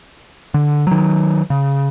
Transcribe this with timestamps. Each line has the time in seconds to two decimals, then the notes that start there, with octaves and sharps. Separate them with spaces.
0.54 D3
0.87 D#3 F#3
1.50 C#3